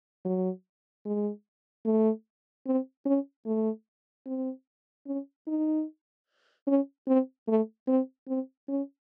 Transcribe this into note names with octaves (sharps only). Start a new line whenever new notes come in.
F#3
G#3
A3
C4
C#4
A3
C4
C#4
D#4
C#4
C4
A3
C4
C4
C#4